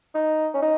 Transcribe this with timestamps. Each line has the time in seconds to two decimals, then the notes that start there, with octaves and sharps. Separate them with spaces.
0.14 D#4
0.54 C#4
0.62 D#4